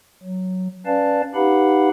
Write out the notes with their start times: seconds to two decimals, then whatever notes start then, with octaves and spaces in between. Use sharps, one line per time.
0.23 F#3
0.86 C#4 B4 D5 F5 A5
1.35 D#4 G4 B4 F5 F#5 B5